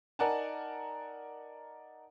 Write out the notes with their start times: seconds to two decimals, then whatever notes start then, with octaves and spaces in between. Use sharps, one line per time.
0.19 D#4 A#4 D5 F#5 G#5 A5